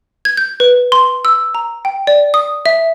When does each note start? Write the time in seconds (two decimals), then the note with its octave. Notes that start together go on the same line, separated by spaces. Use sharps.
0.25 G#6
0.37 G6
0.60 B4
0.92 C6
1.25 E6
1.55 A#5
1.85 G5
2.07 D5
2.34 D#6
2.66 E5